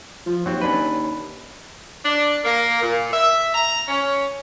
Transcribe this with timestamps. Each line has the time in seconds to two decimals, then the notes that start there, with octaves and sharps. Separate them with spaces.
0.26 F3
0.46 D#2 F#3 C4
0.61 C#4 D4 B4
2.04 D4
2.45 A#3
2.83 A#2
3.13 E5
3.54 A#5
3.88 C#4